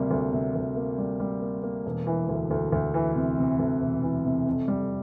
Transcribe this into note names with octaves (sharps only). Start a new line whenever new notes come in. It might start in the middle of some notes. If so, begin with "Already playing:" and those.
Already playing: D2 C3 G3 A#3
D2
C3
D2
A#3
G3
G3
A#3
A#3
E1
E3
D2
D2
D2
E3
C3
C3
D2
E1
E3
C3
F2
G3